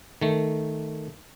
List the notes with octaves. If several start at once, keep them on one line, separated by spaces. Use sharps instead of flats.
D#3 A3